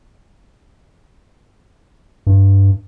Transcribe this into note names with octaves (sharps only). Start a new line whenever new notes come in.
G2